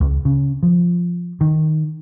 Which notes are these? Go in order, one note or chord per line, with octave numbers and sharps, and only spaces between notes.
C#2
C#3
F3
D#3